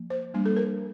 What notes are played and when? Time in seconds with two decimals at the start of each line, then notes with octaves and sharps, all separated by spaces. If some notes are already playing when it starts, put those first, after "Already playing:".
Already playing: F3 A#3
0.10 C5
0.34 G3 A#3 D4
0.46 A4
0.57 A#4